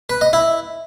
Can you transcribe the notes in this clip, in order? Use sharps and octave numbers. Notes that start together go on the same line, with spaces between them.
B4
D#5
E4